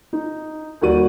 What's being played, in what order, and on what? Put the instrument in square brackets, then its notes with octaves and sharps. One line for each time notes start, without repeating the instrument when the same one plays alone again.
[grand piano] D#4
D#2 G3 F#4 D5 D#7